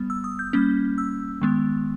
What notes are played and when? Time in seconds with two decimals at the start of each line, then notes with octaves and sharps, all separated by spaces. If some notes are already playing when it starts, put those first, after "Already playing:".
Already playing: G3 B3
0.10 E6
0.24 D#6
0.39 G6
0.53 G3 A#3 C#4
0.98 E6
1.42 D#3 G#3 B3